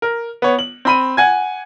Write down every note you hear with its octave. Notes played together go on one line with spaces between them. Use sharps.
A#4
B3 C#5
F#7
C4 B5 D#7
F#5 G#5 G#6